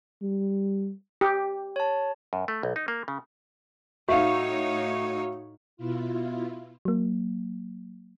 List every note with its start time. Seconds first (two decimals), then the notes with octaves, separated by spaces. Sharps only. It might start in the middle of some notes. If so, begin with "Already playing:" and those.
0.22 G3
1.21 G4
1.76 C#5 A5
2.33 F#2
2.48 A3
2.63 B1
2.76 D#4
2.88 A#3
3.08 C#3
4.09 A2 D#4 F#4 C#5 E5 F5
5.77 B2 E4 F4
6.85 F#3 A#3